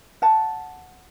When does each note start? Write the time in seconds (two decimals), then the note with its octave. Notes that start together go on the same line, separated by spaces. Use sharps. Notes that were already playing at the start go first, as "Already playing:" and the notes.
0.22 F#5 A5